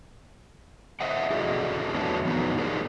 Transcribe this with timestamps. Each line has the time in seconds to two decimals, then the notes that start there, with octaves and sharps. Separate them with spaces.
1.01 C5 D#5 E5 F#5
1.31 E4 F#4 G#4 A4 D5 D#5
1.93 E2 F#3 A3 B3 D4
2.25 F2 D#3 F#3 B3 D#4 B4
2.58 D#4 G4 G#4 A#4 C5 D5